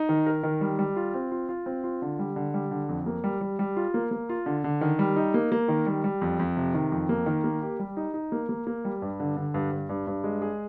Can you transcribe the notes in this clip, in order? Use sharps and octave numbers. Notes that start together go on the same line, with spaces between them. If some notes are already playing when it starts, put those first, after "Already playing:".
Already playing: D#4
D#3
A#4
D#3
G3
G3
F4
C4
F4
F4
C4
F4
D3
G3
D3
G3
D3
F2
A#3
G3
G3
G3
F4
A#3
A#3
F4
D3
D3
D#3
G3
D#4
A#3
A#3
D#3
G3
G3
F2
F2
C3
D#3
F2
A#3
D#3
A#3
G4
G3
D#4
D#4
A#3
A#3
A#3
G3
G2
D3
D3
G2
G2
G2
G2
G#3
G#4